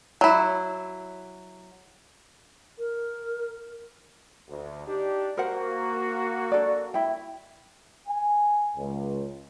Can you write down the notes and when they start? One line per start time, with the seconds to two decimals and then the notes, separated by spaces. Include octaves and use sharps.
0.21 F#3 E4
2.79 A#4
4.48 D2
4.86 D4 D#4 G4
5.37 A#3 F#4 A#4 C5 F#5
6.52 D4 A4 D5
6.94 E4 G5
8.08 G#5
8.76 C#2